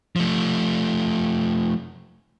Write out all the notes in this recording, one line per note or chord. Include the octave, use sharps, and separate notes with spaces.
F3 A3